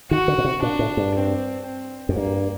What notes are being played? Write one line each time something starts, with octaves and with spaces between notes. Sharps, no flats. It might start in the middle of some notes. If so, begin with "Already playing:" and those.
D#3 F#4
D3
A#2
C3
A#2 D4
A2
G2
C4
C4
F#2
G2 A#3